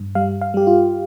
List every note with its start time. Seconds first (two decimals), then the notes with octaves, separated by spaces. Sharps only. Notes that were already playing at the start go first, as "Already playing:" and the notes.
Already playing: G2
0.15 G3 F5
0.41 F5
0.54 G3 G4
0.67 F4